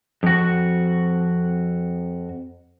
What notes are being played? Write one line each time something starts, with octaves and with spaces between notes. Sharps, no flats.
F2 F#4